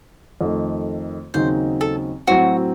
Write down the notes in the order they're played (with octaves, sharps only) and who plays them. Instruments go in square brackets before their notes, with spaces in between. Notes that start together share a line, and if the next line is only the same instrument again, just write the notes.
[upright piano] F2 D#3 A3
[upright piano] D#2 C#3 F#3 C4 D#4 [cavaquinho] C5
[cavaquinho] A4
[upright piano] A2 F#3 C4 [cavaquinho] F#4